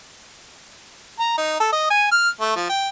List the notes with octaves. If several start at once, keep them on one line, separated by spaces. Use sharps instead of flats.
A#5
D#4
A4
D#5
G#5
F6
A3
F3
G5